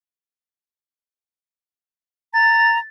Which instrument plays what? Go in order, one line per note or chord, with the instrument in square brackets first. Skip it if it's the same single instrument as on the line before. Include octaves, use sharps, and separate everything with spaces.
[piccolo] A#5 [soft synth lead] A6